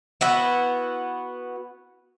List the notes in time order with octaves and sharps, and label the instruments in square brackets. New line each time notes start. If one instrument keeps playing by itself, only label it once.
[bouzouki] B3 E4 F#4